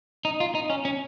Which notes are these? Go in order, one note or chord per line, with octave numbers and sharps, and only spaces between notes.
D#4
F4
D#4
C#4
C#4